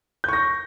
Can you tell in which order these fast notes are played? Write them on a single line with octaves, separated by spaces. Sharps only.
G6 C#6 A#6